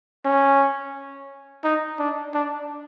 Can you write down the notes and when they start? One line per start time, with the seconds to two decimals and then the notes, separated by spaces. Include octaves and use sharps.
0.25 C#4
1.64 D#4
1.99 D4
2.34 D4